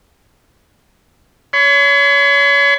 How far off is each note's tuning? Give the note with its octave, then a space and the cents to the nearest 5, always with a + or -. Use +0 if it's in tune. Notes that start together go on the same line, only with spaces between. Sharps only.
C#5 +30 B5 +40